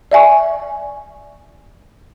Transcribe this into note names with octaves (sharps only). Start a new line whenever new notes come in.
D5 E5 G#5 C#6